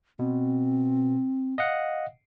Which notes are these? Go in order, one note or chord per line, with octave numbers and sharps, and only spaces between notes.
B2 C4
D#5 F5 F#5